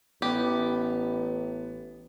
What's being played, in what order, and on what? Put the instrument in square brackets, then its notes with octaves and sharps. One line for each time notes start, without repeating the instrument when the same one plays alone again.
[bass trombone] A1 [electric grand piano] B3 [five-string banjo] G4